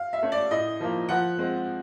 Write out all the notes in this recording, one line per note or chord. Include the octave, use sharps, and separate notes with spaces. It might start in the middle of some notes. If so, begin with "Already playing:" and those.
Already playing: F5
E5
A3 C#4
D5
A2 D#5
F3 A#3
F3 F#5
G#3 C4